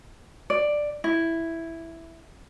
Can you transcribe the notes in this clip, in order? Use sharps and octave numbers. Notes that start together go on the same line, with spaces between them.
D5
E4